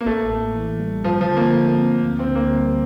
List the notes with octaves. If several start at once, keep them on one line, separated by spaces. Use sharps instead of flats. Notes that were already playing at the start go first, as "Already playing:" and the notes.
A#3
A1 A3
A2
E3
G3
G2 F3
F3
D3
A#3
A3
C4
D2
C4
D3
A#3
G3